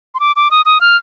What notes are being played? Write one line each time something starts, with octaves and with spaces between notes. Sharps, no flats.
C6
D6
D6
D#6
D#6
F6